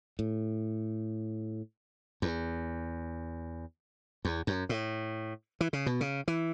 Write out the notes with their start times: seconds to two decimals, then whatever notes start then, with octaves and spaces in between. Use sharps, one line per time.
0.19 A2
2.22 E2
4.25 E2
4.47 F#2
4.69 A2
5.61 E3
5.73 C#3
5.86 B2
6.01 C#3
6.28 E3